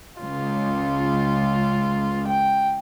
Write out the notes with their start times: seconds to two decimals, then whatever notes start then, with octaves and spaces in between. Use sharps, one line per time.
0.21 C#2 F4
2.27 G5